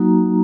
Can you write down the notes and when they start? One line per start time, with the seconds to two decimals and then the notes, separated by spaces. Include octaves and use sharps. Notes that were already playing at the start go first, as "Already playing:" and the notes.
Already playing: F#3 A#3 D#4 F#4 A#5